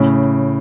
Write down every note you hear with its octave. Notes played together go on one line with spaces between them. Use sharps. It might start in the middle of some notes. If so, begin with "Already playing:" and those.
Already playing: A2 C#3